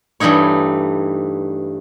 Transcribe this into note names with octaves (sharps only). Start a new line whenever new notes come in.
G2 E3 A3 D#4 C#5